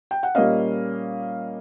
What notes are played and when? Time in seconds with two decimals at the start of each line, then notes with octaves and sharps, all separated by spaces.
0.11 G5
0.23 F#5
0.35 A#2 G3 A#3 C#4 D#5 F5